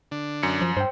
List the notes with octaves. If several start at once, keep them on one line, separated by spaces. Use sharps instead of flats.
D3 D4
F#2 C#7
F3
G2 C5 G5